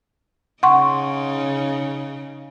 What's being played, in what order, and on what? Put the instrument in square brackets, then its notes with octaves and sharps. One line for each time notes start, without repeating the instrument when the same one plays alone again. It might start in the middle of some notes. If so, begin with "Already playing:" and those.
[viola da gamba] C#3 D#4 [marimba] F#5 C6 C#6